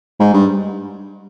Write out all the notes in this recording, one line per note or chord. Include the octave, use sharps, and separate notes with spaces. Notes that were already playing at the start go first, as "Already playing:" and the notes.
G#2
G2